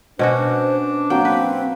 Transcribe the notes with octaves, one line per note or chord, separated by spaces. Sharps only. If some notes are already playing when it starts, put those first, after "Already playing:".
B2 C#4 D4 F#4 C5
F#3 A#3 C4 G5 A5
C4 B4